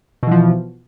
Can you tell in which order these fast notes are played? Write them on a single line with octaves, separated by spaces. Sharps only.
B2 E3 F3